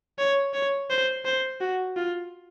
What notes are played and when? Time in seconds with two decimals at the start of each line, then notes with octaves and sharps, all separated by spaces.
0.18 C#5
0.54 C#5
0.90 C5
1.25 C5
1.61 F#4
1.96 F4